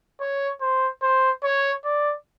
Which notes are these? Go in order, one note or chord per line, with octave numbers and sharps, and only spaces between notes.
C#5
C5
C5
C#5
D5